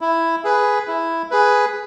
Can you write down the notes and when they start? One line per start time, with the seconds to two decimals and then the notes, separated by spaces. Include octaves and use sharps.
0.01 E4
0.44 G#4 B4
0.88 E4
1.31 G#4 B4